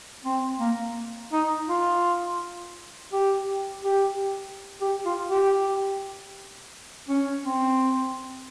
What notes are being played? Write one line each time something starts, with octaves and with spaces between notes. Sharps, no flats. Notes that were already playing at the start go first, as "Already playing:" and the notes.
C4
A#3
D#4
F4
G4
G4
G4
F4
G4
C#4
C4